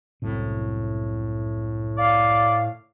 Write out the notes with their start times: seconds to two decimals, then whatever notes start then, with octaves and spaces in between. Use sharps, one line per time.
0.22 C2 F#2 A2 C3
1.98 D5 F5